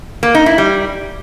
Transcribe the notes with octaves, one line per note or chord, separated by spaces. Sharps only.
A#3
D#4
E4
G3